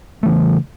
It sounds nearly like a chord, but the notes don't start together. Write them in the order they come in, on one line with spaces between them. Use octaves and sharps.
A3 E3 C#3